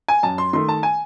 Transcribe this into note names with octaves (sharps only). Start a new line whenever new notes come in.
G#5
F#2 A5
C6
D#3 A3 C6
A5
G#5